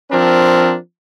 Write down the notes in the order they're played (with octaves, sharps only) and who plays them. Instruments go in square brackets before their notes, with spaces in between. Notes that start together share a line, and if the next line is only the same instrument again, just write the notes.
[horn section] F3 C4 D4 A#4